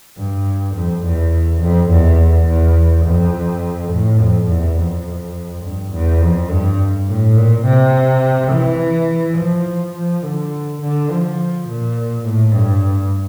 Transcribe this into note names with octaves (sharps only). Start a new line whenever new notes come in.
G2
F2
E2
F2
E2
E2
F2
A2
F2
E2
F2
G2
E2
F2
G2
A2
A#2
C3
E3
F3
F3
D3
D3
F3
A#2
A2
G2